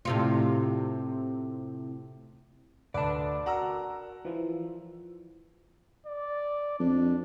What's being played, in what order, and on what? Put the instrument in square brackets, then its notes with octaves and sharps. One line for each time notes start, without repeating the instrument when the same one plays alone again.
[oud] A2 C3 F4
[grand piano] D2 [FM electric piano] B4 [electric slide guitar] D5 A5
[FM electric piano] F#4 A#4 [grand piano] F#5 A#5 E6
[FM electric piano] E3 F3
[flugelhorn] D5
[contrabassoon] F2 [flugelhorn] D4